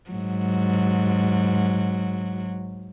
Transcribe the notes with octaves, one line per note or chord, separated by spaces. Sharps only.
G#2 F#3